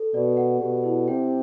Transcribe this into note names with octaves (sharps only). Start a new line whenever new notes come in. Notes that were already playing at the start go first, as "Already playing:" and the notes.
Already playing: A4
B2 D5
F#5
B2 G4
E4
C3 G5